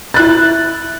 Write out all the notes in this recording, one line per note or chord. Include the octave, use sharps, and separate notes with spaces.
E4 F#6 A6